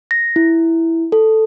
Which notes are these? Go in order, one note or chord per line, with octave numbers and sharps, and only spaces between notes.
A#6
E4
A4